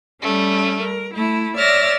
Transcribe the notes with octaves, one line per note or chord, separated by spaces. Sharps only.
G3 A3 C#4
A#4
A3 E4
C#5 D5 E5 F6 A6 A#6